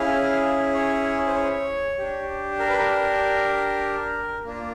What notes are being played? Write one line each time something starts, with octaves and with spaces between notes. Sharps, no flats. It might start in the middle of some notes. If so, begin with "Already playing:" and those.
Already playing: C#4 E4 G#4 F5
C#5
C5
C#5
D4 G4
A#4
B4
A#4
A#3 D4 F4